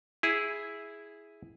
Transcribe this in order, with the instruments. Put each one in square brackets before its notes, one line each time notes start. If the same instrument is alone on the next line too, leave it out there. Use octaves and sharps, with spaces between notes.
[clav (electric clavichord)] E4 G#4